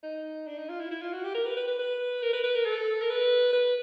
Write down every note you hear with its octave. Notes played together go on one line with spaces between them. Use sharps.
D#4
D4
D#4
F4
E4
E4
F4
F#4
G4
A#4
B4
B4
B4
B4
A#4
B4
B4
A#4
A4
A#4
B4
B4